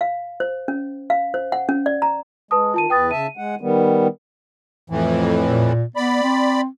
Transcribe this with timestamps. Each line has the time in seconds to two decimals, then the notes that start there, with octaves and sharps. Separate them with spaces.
0.01 F5
0.40 C5
0.68 C#4
1.10 F5
1.34 C5
1.52 F#5
1.69 C#4
1.86 D5
2.02 A#5
2.51 G#3 B4 A5 D#6
2.74 D#3 F4 A5 D#7
2.90 E2 B4 G5 D#6 A6
3.11 C#3 E5 A5 D#7
3.37 G#3 F#5
3.61 D#3 G3 B3
4.90 F2 A2 E3
5.48 A#2
5.96 B3 D5 B5
6.23 C4